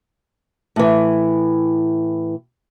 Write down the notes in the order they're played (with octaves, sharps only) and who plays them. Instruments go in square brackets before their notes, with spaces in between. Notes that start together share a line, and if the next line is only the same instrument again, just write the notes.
[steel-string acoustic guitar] A2 E3